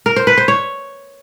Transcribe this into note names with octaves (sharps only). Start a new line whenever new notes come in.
A#4
C5
B4
C5
C#5